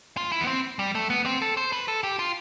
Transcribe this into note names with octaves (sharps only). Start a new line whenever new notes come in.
F4
E4
B3
C4
G3
A3
B3
C4
A4
C5
B4
A4
G4
F4